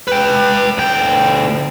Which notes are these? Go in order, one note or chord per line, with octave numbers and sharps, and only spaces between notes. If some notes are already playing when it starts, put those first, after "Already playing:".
B4 G5
D2 G5